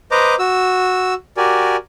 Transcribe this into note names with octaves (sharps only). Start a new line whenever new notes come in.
B4 C5 D#5 A#5 D6
F#4 E6
F#4 G4 A#4 D5 G#5